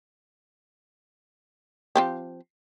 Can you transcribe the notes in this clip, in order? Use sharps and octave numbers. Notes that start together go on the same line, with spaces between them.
F3 C4 G4